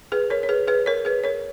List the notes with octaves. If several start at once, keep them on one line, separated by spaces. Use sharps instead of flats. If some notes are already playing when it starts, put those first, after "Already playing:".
G#4 B4
A#4 C#5
C#5
G#4 B4
G#4 B4
A#4 C#5
G#4 B4
A#4 C#5